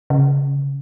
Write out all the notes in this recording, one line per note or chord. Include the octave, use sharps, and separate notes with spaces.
C#3